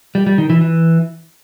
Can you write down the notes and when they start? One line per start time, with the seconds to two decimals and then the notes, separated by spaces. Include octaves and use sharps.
0.15 G3
0.26 G3
0.38 D#3
0.50 E3
0.61 E3